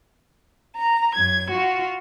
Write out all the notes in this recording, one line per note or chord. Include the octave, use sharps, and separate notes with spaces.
A#5
F#2 G#6
F4 F#4